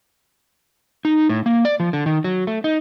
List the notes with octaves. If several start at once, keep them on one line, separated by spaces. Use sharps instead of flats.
D#4
A2
A#3
D5
F3
D3
D#3
F#3
A3
D#4